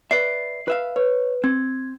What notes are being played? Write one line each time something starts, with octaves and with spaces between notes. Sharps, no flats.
B4 D5 E5 C7
B4 E5 F5
B4 C#5
C4 G#6